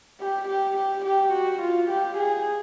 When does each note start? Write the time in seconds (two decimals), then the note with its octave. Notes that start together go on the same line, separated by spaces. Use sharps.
0.20 G4
0.48 G4
0.77 G4
1.05 G4
1.33 F#4
1.62 F4
1.89 G4
2.17 G#4